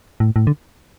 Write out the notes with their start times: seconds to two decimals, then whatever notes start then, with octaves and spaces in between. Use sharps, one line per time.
0.20 A2
0.36 A2
0.47 D3